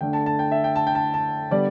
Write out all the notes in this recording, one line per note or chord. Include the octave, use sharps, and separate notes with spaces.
D3 A3 D4 G5
A5
A5
G5
E5
G5
A5
G5
A5
A5
D3 G3 B3 D5